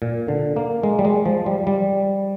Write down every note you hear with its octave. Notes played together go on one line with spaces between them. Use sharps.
A#2
D3
A#3
G#3
G3
G#3
F3
G3
G3